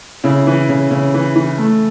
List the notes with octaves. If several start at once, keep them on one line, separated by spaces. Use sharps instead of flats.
C#3 E4
E3
C#3
C#3
E3
E3
A3